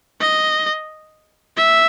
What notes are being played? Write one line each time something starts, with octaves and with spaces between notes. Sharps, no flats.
D#5
E5